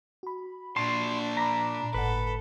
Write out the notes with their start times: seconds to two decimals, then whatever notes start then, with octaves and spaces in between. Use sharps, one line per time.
0.23 F#4 B5
0.77 A#2 D4 A5 C6
1.37 A#5 B5 D6 B6
1.94 G1 A2 A4 B4 F#5